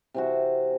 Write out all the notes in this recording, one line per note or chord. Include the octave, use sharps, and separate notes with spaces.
C3 E3 C4 F#4